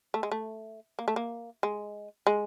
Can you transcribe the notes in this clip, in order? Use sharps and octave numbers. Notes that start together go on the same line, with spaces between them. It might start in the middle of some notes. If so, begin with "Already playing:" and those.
A3
G#3
A3
A#3
A3
A#3
G#3
G#3